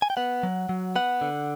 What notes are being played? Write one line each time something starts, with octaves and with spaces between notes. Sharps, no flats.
G#5
G5
B3 F#5
F#3
F#3
B3 F#5
D3